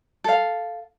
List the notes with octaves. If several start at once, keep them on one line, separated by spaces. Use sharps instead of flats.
A4 F5